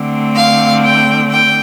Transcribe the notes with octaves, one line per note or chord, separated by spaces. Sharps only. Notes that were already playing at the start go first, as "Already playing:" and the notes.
Already playing: D3 A3 C4
F5
G5
G5